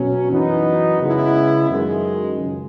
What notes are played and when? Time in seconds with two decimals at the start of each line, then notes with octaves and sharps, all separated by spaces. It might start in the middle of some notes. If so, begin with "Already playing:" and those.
Already playing: B2 F#3 C#4
0.31 F#2 E3 B3 D#4
0.99 C#3 G#3 B3 E4
1.69 F#2 D#3 G#3
2.38 C#2